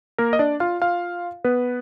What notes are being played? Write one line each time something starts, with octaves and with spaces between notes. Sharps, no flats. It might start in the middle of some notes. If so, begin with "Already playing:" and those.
A#3 A#4
D#5
D4 D5
F4 F5
F4 F5
B3 B4